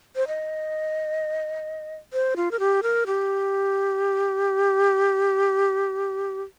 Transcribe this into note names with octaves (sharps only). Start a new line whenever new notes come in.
C5
D#5
C5
F4
A#4
G4
A#4
G4